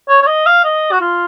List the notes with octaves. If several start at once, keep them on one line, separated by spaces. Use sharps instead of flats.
C#5
C#5
D#5
F5
D#5
F#4
F4